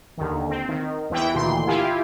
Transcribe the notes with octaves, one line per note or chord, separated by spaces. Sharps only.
D#2 D3 D#3
C4
D#3
E2 E3 E4 G5
D2 A#2 D#3 E3 C6
E4 F4 G4 F5 G#5